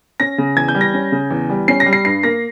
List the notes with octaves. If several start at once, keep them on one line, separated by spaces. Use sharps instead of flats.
C#4 A#6
C#3
E2 G#6
G6
G3
A#6
C#4
C#3
E2
G3
C#4 C7
A#6
G3
C7
G2 C7
A#3 A#6